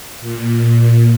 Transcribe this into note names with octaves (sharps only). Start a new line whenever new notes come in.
A#2